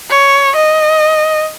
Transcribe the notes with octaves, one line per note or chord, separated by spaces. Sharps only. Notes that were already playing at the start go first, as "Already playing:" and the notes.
C#5
D#5